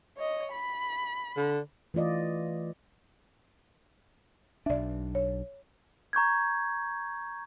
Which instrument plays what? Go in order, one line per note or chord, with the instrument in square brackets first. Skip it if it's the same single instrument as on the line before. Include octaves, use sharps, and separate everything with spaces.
[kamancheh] C#5 D#5
B5
[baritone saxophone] D3
[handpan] E3 A3 F4 D5 D#5
[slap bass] B1 D4 [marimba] D5 E5
[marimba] C#5
[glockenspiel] A#5 C#6 G6 G#6